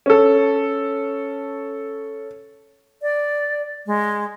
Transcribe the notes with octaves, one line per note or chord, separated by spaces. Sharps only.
C#4 A4
D5
G#3